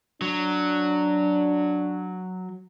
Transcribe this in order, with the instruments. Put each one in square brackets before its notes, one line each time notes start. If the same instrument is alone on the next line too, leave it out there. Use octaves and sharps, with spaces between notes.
[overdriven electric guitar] F#3 [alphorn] D4